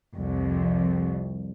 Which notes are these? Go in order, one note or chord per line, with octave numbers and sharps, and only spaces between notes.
C2 F2